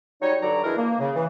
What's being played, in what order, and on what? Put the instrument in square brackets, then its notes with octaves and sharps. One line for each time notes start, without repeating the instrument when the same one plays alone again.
[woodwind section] F#3 G3 D#4 C#5
G2 D3 F#3 F#4 D5 A#5
D#3 E3 D4 E4 G#4 A#4
A#3
C#3
E3